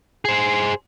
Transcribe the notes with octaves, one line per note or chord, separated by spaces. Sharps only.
G#4 C5